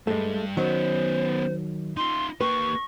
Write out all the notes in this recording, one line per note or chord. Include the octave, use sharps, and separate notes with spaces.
G2 G#3 A3
D#3 F#3 B3 C#4 C5
D#4 F4 C6
A#3 G4 B4 C#6